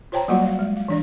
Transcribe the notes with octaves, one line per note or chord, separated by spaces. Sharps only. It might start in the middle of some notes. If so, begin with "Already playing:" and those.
F4 C5 C#5 G5 A5 A#5
F#3 G3 A#3 F4 F#4 F#5
D5 F5
G#3
F5
E3 D4 D5